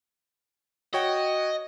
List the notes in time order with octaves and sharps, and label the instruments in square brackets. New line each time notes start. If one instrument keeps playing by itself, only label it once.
[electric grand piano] F#4 C#5 G5 [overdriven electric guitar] D#5